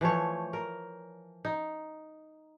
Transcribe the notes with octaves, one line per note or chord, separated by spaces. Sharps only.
E3 F3 A3 C#5
A#4
D#4